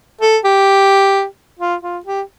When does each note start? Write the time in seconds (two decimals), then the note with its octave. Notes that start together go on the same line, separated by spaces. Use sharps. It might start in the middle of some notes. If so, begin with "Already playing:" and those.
0.21 A4
0.44 G4
1.59 F4
1.82 F4
2.05 G4